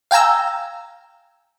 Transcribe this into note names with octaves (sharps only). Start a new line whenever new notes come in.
F5 G5 G#5 A#5 E6